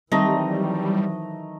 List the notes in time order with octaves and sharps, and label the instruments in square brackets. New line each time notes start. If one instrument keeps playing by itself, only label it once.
[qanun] D#3 C4 [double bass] E3 F#3 [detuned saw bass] G3 [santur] A3 D#5 A#5